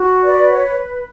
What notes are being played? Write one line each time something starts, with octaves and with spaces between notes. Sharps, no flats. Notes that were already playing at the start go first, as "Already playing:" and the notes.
Already playing: F#4
B4 D5
C#5